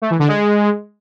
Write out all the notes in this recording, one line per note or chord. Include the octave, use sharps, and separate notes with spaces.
A3
E3
D3
G#3